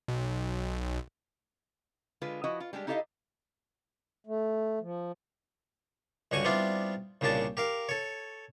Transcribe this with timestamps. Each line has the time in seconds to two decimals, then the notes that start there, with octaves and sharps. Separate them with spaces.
0.08 B1
2.21 D3 G#3 F4 B4
2.44 F3 E4 F#4 D#5
2.60 F4
2.73 G3 G#3 D4 G4
2.87 D#4 E4 G4 A4 D#5 F5
4.27 A3
4.81 F3
6.31 C#2 G2 D3 F#4 G#5 C#6
6.44 G3 B3 C4 D4 E4 F4
7.21 C2 A#2 C#3 D4 G4 A5
7.57 G4 A#4 F5
7.89 A4 C#5